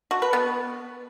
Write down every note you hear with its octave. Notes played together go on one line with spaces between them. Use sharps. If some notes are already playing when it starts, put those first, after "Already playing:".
F#4
B4
B3